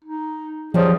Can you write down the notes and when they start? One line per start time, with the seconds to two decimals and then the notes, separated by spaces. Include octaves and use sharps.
0.04 D#4
0.74 F#2 F3 G3 G#4